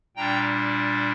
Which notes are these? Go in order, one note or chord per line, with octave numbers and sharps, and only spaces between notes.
A#2 G3 D4 G5 A#5